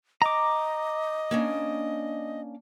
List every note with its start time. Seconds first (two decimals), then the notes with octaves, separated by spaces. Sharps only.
0.22 D#5 A#5 D6
1.31 A#3 C#4 D4